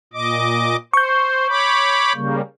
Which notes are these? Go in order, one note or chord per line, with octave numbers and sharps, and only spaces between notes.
A#2 D#5 D6
C5 C#6 G6
C#5 B5 D6
C#3 G3 A#3